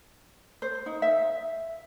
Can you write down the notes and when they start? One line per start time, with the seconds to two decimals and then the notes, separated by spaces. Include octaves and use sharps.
0.62 C5
0.86 D#4
1.02 E5